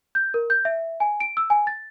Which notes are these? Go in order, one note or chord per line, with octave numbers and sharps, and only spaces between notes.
G6
A#4
G6
E5
G#5
D7
E6
G#5
A6